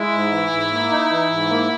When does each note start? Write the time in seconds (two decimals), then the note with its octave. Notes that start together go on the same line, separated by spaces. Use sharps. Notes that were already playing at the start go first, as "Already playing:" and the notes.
Already playing: G#3 E4
0.13 G#2
0.32 E3
0.51 G#2
0.71 A#3
0.90 D#4
1.10 E3
1.30 G#2
1.49 A#3